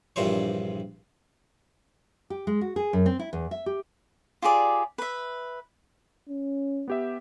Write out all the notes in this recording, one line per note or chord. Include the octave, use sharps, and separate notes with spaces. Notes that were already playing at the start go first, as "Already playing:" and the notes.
A#1 G2 A#2 E3 C5 C#5
G4
G#3
F#4
G#4
F#2
C4
E4
E2
E5
G4
F4 G4 G#4 D5
B4 E5
C#4
B3 G4 E5